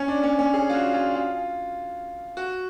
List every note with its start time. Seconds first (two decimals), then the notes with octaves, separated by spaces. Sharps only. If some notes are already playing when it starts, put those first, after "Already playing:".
Already playing: C#4
0.08 D4
0.24 C#4
0.39 C#4
0.54 G#4
0.70 F4
0.74 F#4
0.94 F4
1.15 F4
2.37 F#4